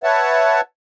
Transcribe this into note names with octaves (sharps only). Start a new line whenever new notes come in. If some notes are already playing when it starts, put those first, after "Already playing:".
B4 C#5 E5 F#5 A5